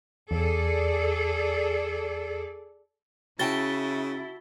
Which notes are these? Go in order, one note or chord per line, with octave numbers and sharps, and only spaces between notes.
E2 G#4 A4 D5
C#3 E4 F#4 G5 A5 A6 G7